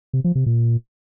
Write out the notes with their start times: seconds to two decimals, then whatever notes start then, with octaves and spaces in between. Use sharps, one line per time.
0.13 C3
0.24 F3
0.35 C3
0.46 A#2